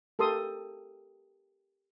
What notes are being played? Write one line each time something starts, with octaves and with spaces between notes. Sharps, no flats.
G4 A4 A#4 C6 D#6